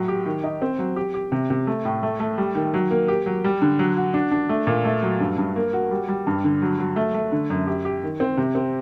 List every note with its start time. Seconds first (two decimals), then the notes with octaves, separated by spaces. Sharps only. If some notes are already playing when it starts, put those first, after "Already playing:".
Already playing: A2 F#3
0.08 G4
0.26 D#3
0.44 D#4
0.62 C4
0.79 F#3
0.96 G4
1.14 G4
1.32 C3
1.50 C3
1.67 A3
1.85 A2
2.03 A3
2.20 A3
2.38 G3
2.55 D#3
2.74 F#3
2.91 A#3
3.08 G4
3.26 F#3
3.44 G3
3.62 D3
3.79 F#3
3.97 F#4
4.14 D4
4.31 D4
4.49 A3
4.67 A#2
4.85 A3
5.02 F#3
5.20 G2
5.38 G2
5.56 A#3
5.73 F#4
5.91 G3
6.08 G3
6.27 G2
6.44 D3
6.62 F#3
6.79 F#3
6.96 A3
7.14 A3
7.32 D3
7.50 F#2
7.67 G4
7.85 G4
8.03 D#3
8.20 C4
8.37 C3
8.55 C4